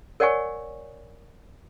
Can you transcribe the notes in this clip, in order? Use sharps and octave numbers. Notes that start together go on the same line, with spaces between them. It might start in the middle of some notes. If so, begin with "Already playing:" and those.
A#4 C#5 D5 F#5 G#5 C#6